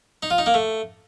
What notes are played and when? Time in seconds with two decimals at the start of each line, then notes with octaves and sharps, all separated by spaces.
0.23 D#4
0.30 F4
0.38 D#4
0.46 A#3
0.54 A3